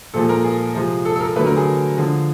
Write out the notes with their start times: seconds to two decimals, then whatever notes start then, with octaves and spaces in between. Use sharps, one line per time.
0.14 A#2 F3 G#3 A4
0.29 A#4
0.44 G#4
0.75 C3 F3 G#3
1.05 A4
1.16 A4
1.20 A#4
1.36 D3 F#3 A3 B4
1.46 A#4
1.56 G#4
1.97 D3 F3 G#3